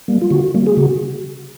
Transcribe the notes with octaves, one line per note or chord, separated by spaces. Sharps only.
G3 A#3
F4
D3 F#4
G3 A#3
G#4
C#3 F#4